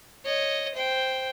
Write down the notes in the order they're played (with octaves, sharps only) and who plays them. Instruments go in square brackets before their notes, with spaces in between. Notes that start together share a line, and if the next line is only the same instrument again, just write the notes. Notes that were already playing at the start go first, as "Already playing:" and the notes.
[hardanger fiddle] C#5 D#5
C5 G5